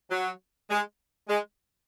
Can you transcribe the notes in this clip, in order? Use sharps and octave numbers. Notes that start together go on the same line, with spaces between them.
F#3
G#3
G#3